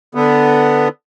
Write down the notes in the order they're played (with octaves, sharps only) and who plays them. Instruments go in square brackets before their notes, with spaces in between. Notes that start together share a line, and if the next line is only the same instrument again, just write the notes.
[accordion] D3 B3